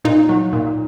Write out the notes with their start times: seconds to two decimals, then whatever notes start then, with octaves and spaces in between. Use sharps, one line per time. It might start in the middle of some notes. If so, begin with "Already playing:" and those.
0.04 A#2 D#4
0.29 F#3
0.53 A#2